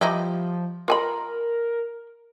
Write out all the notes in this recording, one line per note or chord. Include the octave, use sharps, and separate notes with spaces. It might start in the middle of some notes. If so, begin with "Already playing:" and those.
F3 G3 D#4 E4
F4 A#4 G#5 B5